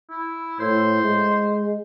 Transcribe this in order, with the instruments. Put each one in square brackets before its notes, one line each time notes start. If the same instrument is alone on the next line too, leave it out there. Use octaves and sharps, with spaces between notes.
[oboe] E4
[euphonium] A2 [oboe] C5
[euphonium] G#3